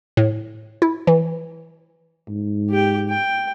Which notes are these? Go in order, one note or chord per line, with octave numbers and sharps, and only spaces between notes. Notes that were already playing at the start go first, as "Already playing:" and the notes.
A2
E4
E3
G#2
G4 G5
G5